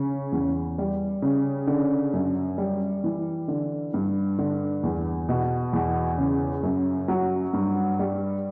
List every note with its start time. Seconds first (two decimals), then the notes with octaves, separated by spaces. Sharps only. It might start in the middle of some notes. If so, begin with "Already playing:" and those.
Already playing: C#3
0.32 E2
0.78 G3
1.22 C#3
1.67 D3
2.13 F#2
2.58 G3
3.04 E3
3.48 D3
3.94 G2
4.39 D3
4.83 E2
5.29 B2
5.73 E2
6.18 C#3
6.63 F#2
7.08 F#3
7.53 G2
7.99 G3